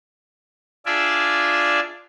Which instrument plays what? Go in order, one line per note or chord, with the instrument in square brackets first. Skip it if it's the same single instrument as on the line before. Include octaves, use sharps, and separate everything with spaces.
[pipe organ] D4 F4 G#4 D5 E5